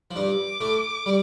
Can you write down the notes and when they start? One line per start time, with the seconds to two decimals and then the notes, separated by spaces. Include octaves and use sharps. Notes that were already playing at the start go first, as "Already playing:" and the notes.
0.11 F3
0.16 G2 G3 D6
0.61 A2 A3
1.06 G3